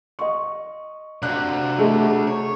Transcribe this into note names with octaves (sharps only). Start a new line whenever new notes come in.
D#5 C6 C#6
C3 D4 F#4 F5 F#6
A3 E4 G#4 D#5
C#5 A#5